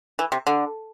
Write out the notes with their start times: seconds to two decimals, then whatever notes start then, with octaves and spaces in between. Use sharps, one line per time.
0.19 E3
0.32 C3
0.47 D3